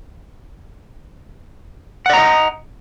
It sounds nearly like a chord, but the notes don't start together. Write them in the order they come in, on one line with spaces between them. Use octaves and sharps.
F#5 D5 A#5 D#5